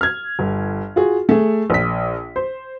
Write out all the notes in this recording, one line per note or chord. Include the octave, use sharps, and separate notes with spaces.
F6 G#6
G1
F4 F#4 G#4
A3 G#4
A#1 B6
C5